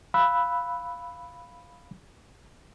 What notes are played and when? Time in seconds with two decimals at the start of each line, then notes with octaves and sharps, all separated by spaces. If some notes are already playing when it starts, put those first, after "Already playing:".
0.14 F5 B5 E6 F#6